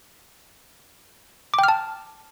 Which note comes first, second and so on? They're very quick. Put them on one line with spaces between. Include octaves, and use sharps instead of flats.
D6 G5 F6 A5